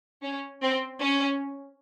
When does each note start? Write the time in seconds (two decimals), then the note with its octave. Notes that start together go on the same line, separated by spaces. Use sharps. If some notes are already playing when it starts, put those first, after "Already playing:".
0.22 C#4
0.61 C4
1.00 C#4